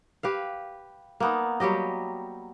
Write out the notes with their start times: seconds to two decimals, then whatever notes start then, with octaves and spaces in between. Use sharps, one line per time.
0.23 G4 B4 F5
1.20 A#3 B3 D#4
1.60 F#3 G3 G4 D#5